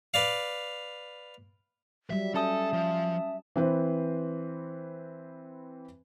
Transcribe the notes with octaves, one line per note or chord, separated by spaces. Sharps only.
B4 D5 F5
F#3 G3 E5
C#4 A4 E5 A5 D#6
F3
E3 C4 B4 C5